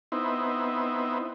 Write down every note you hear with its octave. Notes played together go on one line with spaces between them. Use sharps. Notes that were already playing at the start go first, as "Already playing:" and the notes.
B3 C4 D#4 E4